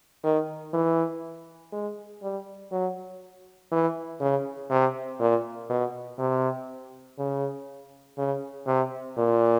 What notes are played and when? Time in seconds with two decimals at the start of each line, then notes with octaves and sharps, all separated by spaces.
0.24 D#3
0.73 E3
1.72 G#3
2.22 G3
2.72 F#3
3.72 E3
4.20 C#3
4.70 C3
5.20 A#2
5.70 B2
6.19 C3
7.18 C#3
8.18 C#3
8.67 C3
9.17 A#2